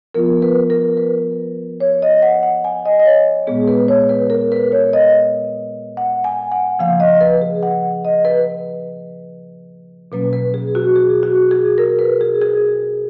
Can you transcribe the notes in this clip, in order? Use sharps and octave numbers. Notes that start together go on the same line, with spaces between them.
F3 B3 F4 A#4
B4
A#4
B4
C#5
D#5
F#5
F#5
G#5
D#5
D#5
C#5
A#2 G#3 B3 G#4
B4
C#5
B4
A#4
B4
C#5
D#5
F#5
G#5
F#5
C#3 F3 A#3 F5
D#5
B4
G#4
F#5
D#5
B4
B2 F#3 A#3 C#4 B4
B4
G#4
F#4
G#4
F#4
G#4
A#4
B4
G#4
G#4